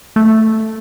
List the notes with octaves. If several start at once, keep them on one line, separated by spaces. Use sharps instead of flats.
A3